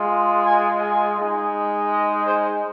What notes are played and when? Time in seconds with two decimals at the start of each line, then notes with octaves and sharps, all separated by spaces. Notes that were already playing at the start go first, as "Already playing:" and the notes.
Already playing: G#3 F4
0.46 G#5
0.81 G#5
1.17 G#3 D#4
1.90 D#5
2.26 C5